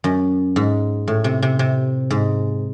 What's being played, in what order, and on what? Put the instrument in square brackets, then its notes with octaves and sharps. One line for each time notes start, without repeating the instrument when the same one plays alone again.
[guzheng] F#2
G#2
A2
C3
C3
C3
G#2